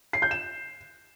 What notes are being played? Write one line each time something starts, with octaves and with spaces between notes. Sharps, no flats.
C7
G6
E7